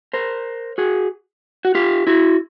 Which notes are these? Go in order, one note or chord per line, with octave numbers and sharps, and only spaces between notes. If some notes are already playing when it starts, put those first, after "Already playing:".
A#4 C5
F#4 G#4
F#4
F4 G4
E4 F#4